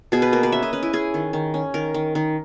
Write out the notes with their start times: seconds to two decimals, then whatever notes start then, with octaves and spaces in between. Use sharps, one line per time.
0.12 B2 G#4
0.22 B4
0.33 A#3 A#4
0.43 B4
0.52 C#4 E5
0.63 D#5
0.73 C#4 B4
0.83 E4
0.93 C#4 G#4
1.14 D#3
1.33 D#3
1.54 C#4
1.74 D#3 A#4
1.94 D#3
2.15 D#3